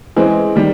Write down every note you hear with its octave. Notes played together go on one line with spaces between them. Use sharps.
E3 G#3 C4
D#3 G3